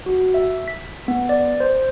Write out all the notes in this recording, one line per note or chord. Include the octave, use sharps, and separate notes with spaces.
F#4
E5
B6
B3
D5
C5